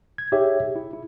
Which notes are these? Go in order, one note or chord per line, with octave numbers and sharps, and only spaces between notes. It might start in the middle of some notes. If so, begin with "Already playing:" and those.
G#6
D#4 G4 G#4 C#5 E5
E4
E4